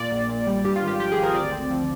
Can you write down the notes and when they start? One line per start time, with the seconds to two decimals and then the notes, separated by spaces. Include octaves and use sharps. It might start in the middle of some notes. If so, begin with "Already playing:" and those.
Already playing: A#2 D5
0.12 A#1
0.29 A#2
0.47 G3
0.64 G2 G4
0.76 F4
0.82 G#1
0.87 G4
0.99 F3 G4
1.12 G#4
1.17 G#1
1.23 A#4
1.35 D2 D5
1.52 C4
1.71 F3